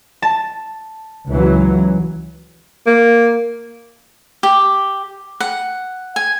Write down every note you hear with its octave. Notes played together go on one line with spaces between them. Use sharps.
A5
C#2 E3 F#3
A#3
G4
F#5
G#5